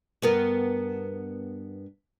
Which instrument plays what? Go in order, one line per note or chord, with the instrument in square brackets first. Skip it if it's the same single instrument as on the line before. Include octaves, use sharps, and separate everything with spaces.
[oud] G2 B3 A#4